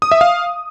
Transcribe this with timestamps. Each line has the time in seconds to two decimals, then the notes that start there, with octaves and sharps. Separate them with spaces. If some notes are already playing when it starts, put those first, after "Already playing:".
0.02 D#6
0.11 E5
0.21 F5